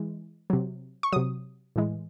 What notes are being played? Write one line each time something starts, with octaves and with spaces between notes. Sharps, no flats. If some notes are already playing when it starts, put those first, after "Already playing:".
Already playing: E3 G#3
C3 F#3
C#6
C3 F#3 D#6
A2 E3 G#3